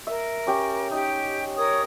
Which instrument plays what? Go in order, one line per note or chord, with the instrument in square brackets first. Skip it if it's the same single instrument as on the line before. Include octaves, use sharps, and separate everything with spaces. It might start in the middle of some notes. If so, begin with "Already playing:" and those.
[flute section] A#4 [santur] E5
[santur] C#4 G4
[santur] D#4 [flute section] G4
[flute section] A#4 C#5 D#6